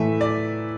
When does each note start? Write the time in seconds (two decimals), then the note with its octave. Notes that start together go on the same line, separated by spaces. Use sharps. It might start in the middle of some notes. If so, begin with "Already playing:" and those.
Already playing: A2 E3 A3 E5
0.21 D5